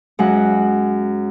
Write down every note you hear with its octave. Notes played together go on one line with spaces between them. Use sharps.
F#2 G#3 F#5